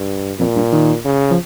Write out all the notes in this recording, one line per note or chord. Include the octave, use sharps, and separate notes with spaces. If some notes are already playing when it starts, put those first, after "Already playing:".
Already playing: G2
F2 A#2
G2
D#3
C#3
F3